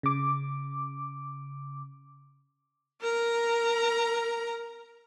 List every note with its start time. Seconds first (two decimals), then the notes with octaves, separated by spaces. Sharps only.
0.03 C#3 D6
3.02 A#4 A#5